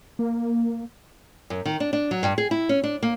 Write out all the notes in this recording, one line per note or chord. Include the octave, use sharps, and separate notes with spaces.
A#3
F#2
D#3
D4
D4
F#3
G2
G#4
E4
C#4
D4
A#3